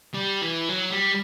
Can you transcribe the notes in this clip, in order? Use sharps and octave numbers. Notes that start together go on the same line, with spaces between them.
G3
E3
F#3
G3